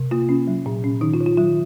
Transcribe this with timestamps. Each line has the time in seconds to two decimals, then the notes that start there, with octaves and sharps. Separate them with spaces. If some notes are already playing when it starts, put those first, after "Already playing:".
Already playing: C3
0.11 A#3 F4
0.29 C#4
0.47 F#3
0.66 A#2
0.84 C#4
1.01 D#3 D#4
1.14 F4
1.20 D#3
1.26 F4
1.37 F#3 F4